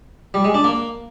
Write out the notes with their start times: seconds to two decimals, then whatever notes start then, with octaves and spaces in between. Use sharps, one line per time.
0.34 G3
0.44 G#3
0.54 D4
0.64 A#3